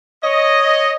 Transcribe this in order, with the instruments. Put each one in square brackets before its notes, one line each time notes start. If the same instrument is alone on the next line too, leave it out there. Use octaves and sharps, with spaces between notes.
[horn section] C#5 D#5